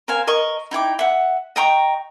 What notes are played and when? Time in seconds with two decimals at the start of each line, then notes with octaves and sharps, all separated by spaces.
0.08 A#4 C5 F5 G#5
0.27 A#4 D#5 C#6
0.71 D#4 E4 G5 D6
0.99 E5 F#5
1.56 D#5 G5 A#5 C#6